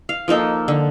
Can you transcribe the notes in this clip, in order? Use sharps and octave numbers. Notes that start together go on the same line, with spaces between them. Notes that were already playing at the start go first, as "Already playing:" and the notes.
F5
F3 A#3 D#4 A4
D3